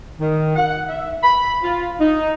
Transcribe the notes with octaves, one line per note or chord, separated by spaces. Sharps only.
D#3
F#5
E5
B5
F4
D#4